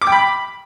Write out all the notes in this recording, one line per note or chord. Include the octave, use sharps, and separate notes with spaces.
D6
G5
B5